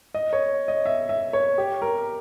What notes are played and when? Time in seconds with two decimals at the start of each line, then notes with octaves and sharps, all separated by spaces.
0.15 D#5
0.33 C#5
0.68 D#5
0.86 E5
1.09 E5
1.33 C#5
1.58 G4
1.82 A#4